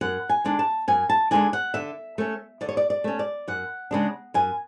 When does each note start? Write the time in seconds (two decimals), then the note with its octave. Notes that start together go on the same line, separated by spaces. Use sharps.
0.01 F#2 F#5
0.29 G#5
0.44 D3 G#3 D4
0.59 A5
0.88 F#2 G#5
1.09 A5
1.31 D3 G#3 D4 G#5
1.53 F#5
1.74 D3 E5
2.18 A3 C#4
2.61 D3 D5
2.69 C#5
2.77 D5
2.90 D5
3.04 A3 C#4
3.19 D5
3.48 F#2 F#5
3.91 C#3 G#3 D4
4.34 F#2 G#5